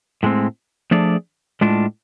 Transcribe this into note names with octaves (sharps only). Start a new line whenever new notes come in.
A2 G#3 C4
F3 A3 D4 G#4 D5
A2 G#3 D4 F4